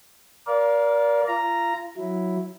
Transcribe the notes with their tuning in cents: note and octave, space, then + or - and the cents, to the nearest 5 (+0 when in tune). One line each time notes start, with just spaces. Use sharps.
A#4 +25 D5 -20 F5 +0
F4 -30 A#5 +0
F#3 -10 E4 +0